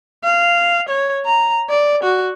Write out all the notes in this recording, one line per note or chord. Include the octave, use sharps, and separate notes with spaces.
F5
C#5
A#5
D5
F#4